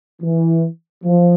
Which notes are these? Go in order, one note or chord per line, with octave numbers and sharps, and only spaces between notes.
E3
F3